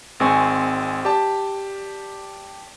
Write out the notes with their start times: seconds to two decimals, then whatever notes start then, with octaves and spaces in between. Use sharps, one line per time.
0.20 G#1 G#3 C4 G#5 C#6
1.05 G4 D5 A5